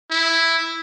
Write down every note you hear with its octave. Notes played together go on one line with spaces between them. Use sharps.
E4